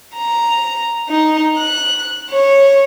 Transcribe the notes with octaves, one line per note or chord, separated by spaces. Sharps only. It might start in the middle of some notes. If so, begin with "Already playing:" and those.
A#5
D#4
F#6
C#5